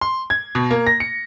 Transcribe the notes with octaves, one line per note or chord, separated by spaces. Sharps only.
C6
G#6
B2
A#3
A#6
C#7